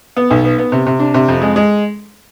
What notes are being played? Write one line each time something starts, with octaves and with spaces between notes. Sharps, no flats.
B3
B1
B3
B3
C3
C3
D4
C3
F2
G#3
G#3